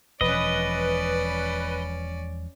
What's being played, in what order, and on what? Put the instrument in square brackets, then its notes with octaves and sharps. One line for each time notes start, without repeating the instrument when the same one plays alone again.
[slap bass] E1 F3 [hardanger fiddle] C#4 D5 [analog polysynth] B4 [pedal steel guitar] D#5